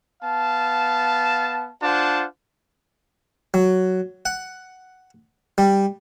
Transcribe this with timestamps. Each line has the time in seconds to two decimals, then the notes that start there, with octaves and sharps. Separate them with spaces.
0.23 B3 F5 A5
1.83 D4 F4 C5 F#5 A5
3.54 F#3
4.26 F#5
5.58 G3